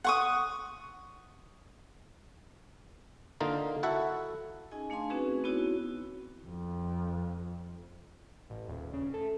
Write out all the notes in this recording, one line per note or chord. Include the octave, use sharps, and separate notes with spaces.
F#5 C#6 D#6
D3 A#3 D#4 F4 A#4
E4 F#4 A4 E5 F#5
C#4 D#4 G#4 D#5 G#5
A3 D4 F5 G#5 C6
C4 C#4 D#4 F#4 G#4 B4
B3 C4 D#4 E4 F#4 C#5
F2
A1
D#1
C#3
A3